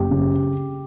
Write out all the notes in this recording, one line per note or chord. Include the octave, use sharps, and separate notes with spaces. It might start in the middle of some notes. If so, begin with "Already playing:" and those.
Already playing: F#1 G4
C#3